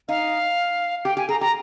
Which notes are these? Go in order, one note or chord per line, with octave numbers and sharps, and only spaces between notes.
D#4 F5
G4 G5
G4 G#5
G#4 A#5
G4 A#5